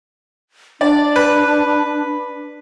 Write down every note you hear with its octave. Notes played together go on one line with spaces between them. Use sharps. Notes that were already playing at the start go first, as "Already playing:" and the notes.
D4 D5
B4